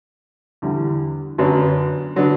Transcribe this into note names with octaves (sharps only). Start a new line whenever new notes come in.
E2 D3 G3
F#2 D3 F#3 B3 D4
D3 F#3 B3 D4